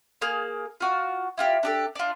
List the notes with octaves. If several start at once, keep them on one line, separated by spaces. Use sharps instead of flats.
A#3 G#4 F6
F4 F#4
E4 F4 G4
D4 G4 A4
D4 F4